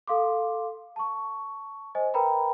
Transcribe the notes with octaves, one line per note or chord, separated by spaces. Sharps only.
A4 F5 C6 D6
A5 C#6
C5 D#5 G#5
A#4 B4 G5 A#5 B5